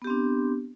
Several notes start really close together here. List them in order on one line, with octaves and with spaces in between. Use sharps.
B3 G4 C4 D4